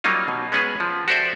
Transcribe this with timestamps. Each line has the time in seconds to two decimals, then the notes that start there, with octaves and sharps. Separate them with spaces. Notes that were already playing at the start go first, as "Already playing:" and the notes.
0.04 F#3 G3 A#3 C#4 D#4 F4
0.28 B2
0.52 G#3 B3 C#4 G#4 B4
0.80 F3
1.08 F#4 G4 A4 C5 D5 E5